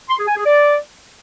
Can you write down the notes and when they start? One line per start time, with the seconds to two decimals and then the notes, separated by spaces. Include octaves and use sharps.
0.09 C6
0.18 G#4
0.27 G#5
0.36 G#4
0.45 D5